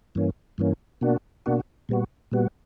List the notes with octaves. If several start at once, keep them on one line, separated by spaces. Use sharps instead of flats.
G2 E3 A#3 C#4
G2 E3 A#3 C#4
B2 A#3 D4 F#4
B2 A#3 D4 F#4
A#2 G3 B3 F#4
A#2 G3 B3 F#4